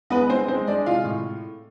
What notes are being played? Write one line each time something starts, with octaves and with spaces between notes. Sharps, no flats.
G#3 B3 B4
G#3 C4 C5
G#3 C4 C5
G#3 D4 D5
C3 F4 F5
A2